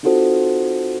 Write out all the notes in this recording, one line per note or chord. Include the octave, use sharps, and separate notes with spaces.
C4 D#4 F4 F#4 A4 C5